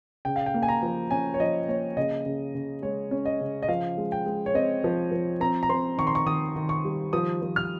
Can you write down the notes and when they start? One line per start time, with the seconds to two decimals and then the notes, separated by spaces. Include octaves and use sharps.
0.25 C#3 G5
0.36 F5
0.46 G5
0.54 A#3
0.63 G#5
0.69 A#5
0.83 F3
1.11 C#4 G#5
1.34 C#5
1.40 F3 D#5
1.68 A#3 C#5
1.97 C#3 D#5
2.26 C#3
2.55 C#3
2.82 G#3 C#5
3.11 C#4
3.25 D#5
3.41 C#3
3.63 D#5
3.68 F3 F5
3.98 G#3
4.12 G5
4.26 G#3
4.46 C#5
4.54 C4 D#5
4.84 F3
5.12 F3
5.41 C4 A#5
5.63 A#5
5.70 C4 C6
5.98 D#3 C#6
6.07 C6
6.15 C#6
6.26 D#3 D#6
6.56 D#3
6.69 C#6
6.85 G3
7.13 F3 D#6
7.42 F3
7.56 F6